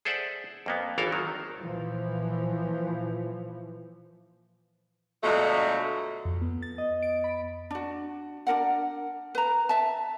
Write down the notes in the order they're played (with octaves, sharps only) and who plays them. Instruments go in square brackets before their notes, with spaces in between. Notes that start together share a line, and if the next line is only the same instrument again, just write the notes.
[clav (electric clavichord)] G#4 A4 C5 D5 E5 F#5
F2 A#3 B3
G#1 E3 A4 A#4 F5
D#3 F#3
[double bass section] A#2 E3 F3
[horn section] B2 D3 F3 F#3 G#3 A3
[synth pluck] F2
B3
A6
D#5
D7
B5
[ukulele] D4 F#4
D4 F#4 A#4 F#5
B4 A#5
E5 A5